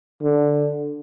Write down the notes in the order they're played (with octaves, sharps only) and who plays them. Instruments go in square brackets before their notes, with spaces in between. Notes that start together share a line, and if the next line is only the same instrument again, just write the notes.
[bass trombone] D3